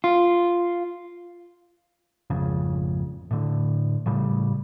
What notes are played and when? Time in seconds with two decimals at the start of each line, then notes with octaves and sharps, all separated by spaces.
0.04 F4
2.30 G#1 F2 C#3
3.31 A2 D3
4.06 A2 C#3 G3